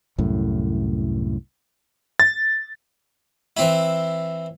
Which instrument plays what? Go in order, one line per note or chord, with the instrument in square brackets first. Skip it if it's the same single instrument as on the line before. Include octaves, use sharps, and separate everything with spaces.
[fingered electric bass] C2 F#2 A2
[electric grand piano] A6
[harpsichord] E3 C4 E4